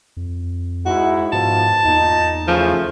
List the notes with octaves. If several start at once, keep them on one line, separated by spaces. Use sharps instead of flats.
F2
G#2 D#4 E4 F#4
G#2 B2 D#3 F3 A5
E2 A#2 D#4
C#3 E3 F3 A3